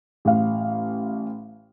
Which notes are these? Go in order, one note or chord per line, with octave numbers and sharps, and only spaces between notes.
A1 F5